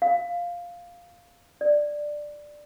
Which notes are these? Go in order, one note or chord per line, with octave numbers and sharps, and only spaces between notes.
F5
D5